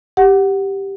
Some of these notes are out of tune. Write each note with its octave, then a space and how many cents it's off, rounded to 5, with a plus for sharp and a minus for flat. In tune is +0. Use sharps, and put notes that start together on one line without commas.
G4 +0 F#5 +0